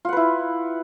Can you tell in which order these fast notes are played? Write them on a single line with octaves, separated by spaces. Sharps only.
F4 F#5 B4 E4